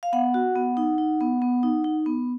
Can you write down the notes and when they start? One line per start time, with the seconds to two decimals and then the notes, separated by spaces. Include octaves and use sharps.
0.03 F5
0.13 B3 F#5
0.34 F#4
0.56 B3
0.77 D#4
0.98 D#4
1.21 B3
1.42 B3
1.63 D#4
1.84 D#4
2.06 B3